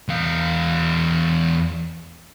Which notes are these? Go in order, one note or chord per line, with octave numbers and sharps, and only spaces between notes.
E2 F5